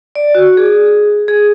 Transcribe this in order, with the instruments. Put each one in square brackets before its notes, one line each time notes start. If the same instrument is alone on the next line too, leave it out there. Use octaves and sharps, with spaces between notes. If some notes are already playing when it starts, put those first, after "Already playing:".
[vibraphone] D5
F#4
G#4
G#4